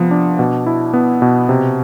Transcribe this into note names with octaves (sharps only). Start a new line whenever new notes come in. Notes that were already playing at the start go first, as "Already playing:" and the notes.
Already playing: C3 F3 B3
D4
B2
E4
B3
B2
C3